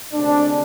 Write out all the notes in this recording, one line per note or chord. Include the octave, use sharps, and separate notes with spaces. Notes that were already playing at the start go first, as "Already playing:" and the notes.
D2 C3 G#3 C4 D4